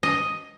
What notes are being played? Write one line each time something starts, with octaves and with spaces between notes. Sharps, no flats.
D#5